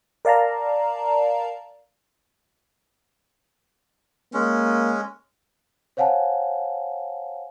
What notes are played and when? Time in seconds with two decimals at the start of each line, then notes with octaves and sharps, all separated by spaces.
0.25 A#4 D5 F5 A5 A#5
4.34 G#3 A#3 C#4
5.97 C5 C#5 F5 F#5 G#5 A5